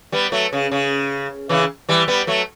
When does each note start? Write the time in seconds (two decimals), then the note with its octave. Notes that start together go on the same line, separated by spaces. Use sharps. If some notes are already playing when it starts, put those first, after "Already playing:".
0.12 G3 B3
0.32 F#3 A3
0.53 C#3
0.72 C#3
1.49 C#3 E3
1.89 E3 G3
2.08 G3 B3
2.27 F#3 A3